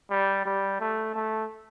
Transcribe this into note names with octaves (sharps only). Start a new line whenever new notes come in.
G3
G3
A3
A3